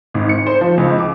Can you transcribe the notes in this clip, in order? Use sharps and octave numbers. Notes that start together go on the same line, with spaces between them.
G#1
C#7
C5
F3
C#2
D6